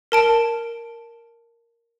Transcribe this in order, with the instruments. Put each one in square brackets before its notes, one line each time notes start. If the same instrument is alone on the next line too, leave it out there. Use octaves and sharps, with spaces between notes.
[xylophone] A#4 A5 D7